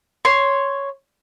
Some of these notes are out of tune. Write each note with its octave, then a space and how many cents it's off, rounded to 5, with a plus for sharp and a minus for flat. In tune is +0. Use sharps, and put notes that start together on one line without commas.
C#5 +0 C6 +0